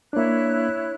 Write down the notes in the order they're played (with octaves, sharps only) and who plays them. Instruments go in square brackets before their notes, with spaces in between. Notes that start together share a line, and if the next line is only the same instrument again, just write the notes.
[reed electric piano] A#3 D4 [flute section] E4 C#5 F#6